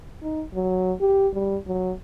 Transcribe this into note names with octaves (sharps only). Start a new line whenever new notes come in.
D#4
F#3
G4
G3
F#3